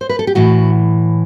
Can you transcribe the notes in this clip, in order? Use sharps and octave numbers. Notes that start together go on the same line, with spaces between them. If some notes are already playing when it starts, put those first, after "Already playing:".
C5
B4
A4
G4
A2 E3 F#4